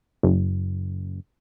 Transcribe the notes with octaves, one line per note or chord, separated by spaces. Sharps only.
F#1